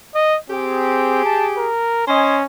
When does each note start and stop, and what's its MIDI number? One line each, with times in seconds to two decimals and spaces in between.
0.15 0.37 75
0.50 1.24 60
0.50 1.68 67
0.50 1.68 68
1.25 1.47 81
1.58 2.07 70
2.08 2.46 61
2.08 2.37 72
2.08 2.37 75
2.08 2.37 80